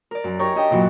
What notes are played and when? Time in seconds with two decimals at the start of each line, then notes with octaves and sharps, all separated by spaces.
0.11 A#4 D5
0.24 F#2
0.39 D#4 G4 A#4 C#5 A#5 C#6
0.55 D4 G4 D#5 E5 G5
0.70 G2 A#2 E3 F#3 F#4